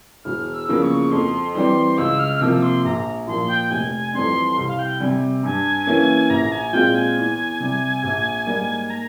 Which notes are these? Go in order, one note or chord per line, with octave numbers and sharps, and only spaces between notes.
E1 F6
E6
E2 C#3 F3 A#3
C#6
F2 C6
E3 G3 C4 C6
C#2 E6
F6
C3 F3 A#3 E6
C6
A#1 A#5
A#2 F3 A#3 C6
G5
F1 G#5
F2 E3 G3 C4 C6
C2
F5
G5
C3 G3 G#5
G2 G#5
E3 A#3 C#4 E4
A#1 A#5
G#5
A#2 G#3 C4 F4 G5
G#5
E2
C3 G3
A#1
G#2 G3 A#3
A#5